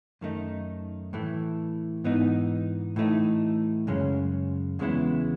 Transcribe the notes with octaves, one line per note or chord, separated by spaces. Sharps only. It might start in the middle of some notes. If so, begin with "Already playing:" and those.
F#2 D#3 A3 D#4
A2 E3 A3
G#2 E3 B3 D#4
A2 E3 A3 D#4
F#2 C#3 G#3 C#4
E2 C#3 G#3 B3 E4